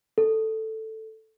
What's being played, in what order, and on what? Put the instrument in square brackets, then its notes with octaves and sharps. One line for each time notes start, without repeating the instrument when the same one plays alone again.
[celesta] A4